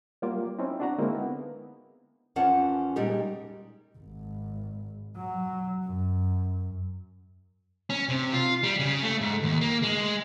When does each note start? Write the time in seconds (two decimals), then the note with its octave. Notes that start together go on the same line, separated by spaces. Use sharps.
0.22 F#3 G3 A#3 F4 D6
0.59 C4 C#4 D#4 E4
0.80 D4 F#4 A#5
0.98 D3 G#3 A#3 C4 D#4 E4
1.15 B3
2.36 E2 F3 C#4 A#4 F#5 A5
2.96 A#2 G3 G#3 D#4 G4 A#4
3.98 G#1
5.16 F#3
5.84 F#2
7.90 C#4
8.09 C3
8.32 F4
8.63 G3
8.79 C#3
9.03 A3
9.21 G#2
9.43 D#2
9.61 A#3
9.83 G#3